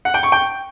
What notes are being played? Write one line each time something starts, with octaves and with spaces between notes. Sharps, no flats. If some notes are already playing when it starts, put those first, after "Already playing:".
F#5
G5
C#6
G5